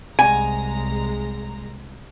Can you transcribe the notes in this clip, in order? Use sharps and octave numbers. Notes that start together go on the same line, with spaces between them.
C2 G#3 G#5 A#5